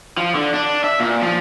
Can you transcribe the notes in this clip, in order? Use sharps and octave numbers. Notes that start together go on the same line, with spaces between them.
F3
D3
D4
E5
A#2
F3